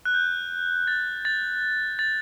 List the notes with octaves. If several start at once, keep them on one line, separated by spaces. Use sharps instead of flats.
F#6
G6
A6
A6
A6